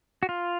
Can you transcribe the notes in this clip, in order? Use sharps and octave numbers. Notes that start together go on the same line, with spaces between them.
F#4
F4